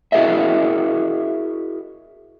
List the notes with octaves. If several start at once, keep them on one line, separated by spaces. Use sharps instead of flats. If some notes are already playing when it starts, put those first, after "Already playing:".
E4 F#4 G#4 A#4 D#5 E5